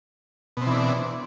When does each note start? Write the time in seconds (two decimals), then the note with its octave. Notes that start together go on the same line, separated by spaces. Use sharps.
0.57 B2
0.62 C4
0.66 E3
0.71 D4